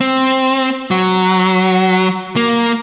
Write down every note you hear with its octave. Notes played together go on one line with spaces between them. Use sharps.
C4
F#3
A#3